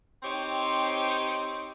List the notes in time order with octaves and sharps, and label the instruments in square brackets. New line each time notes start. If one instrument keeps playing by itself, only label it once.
[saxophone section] C4 D#4 G4 C5 C#5